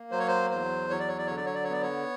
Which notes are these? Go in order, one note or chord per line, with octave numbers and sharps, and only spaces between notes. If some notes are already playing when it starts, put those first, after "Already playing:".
Already playing: A#3
F#3 C5
C#5
C5
E2 C5
F#3 C#5
D5
C#5
D5
D3 C#5
D5
C#5
D5
C#5
B3 D5
C#5